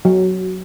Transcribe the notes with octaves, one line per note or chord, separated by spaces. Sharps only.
F#3